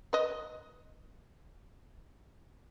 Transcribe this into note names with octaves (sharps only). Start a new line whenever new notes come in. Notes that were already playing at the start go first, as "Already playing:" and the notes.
B4 D#5